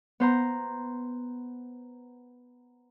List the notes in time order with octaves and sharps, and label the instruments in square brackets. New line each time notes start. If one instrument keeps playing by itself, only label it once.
[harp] B3 C5 A#5